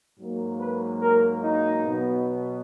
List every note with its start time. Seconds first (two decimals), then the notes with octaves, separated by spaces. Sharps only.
0.18 G#2 F#3 A#3
0.59 B4
1.01 A#4
1.43 D#4
1.84 B2 F#3 B3